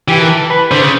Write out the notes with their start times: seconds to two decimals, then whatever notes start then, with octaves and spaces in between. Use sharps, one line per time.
0.08 E3 G4
0.20 A#4
0.29 A4
0.50 B4
0.71 D3 C5
0.81 C#3